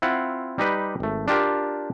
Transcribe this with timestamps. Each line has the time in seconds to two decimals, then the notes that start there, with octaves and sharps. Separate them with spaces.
0.02 C4 E4 F4 F#5
0.58 G3 D#4 G4 B4
1.00 G#1 A3
1.28 D4 F4 G4 A#4